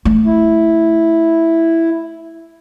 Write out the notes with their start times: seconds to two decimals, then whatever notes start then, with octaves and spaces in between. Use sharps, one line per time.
0.05 A3
0.25 E4